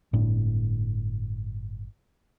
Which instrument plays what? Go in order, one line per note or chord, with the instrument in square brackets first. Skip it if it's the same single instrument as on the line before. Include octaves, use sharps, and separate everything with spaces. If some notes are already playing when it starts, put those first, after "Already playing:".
[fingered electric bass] G1 A2 D4